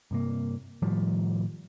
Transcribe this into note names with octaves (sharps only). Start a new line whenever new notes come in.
G2 C3 A#3
A2 D#3 F3 G3